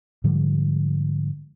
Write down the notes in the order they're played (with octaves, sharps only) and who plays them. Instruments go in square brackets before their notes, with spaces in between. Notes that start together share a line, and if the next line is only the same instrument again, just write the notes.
[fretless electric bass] G#2 D3 F3 G3